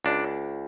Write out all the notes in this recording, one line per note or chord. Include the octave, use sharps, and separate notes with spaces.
C#2 D4